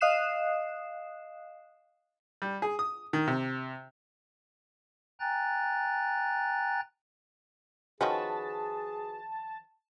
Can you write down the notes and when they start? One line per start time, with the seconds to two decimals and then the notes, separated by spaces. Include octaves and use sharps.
0.01 D#5 F5 D#6 F#6 C7 E7
2.42 G3
2.62 G#4
2.79 D#6
3.13 D#3
3.27 C3
5.20 G5 G#5 A#5 F#6 A6
8.01 D#3 F3 C#4 F#4 G#4 B4 A5